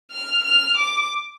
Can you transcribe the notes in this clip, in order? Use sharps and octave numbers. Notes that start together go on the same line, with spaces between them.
F6
F6
D6